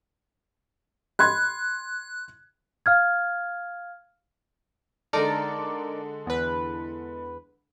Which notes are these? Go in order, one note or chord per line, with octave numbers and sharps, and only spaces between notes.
B5 C6 F#6 G#6
F5 F6 G#6
D3 G#3 D#4 A4 A#4 D5
E2 B4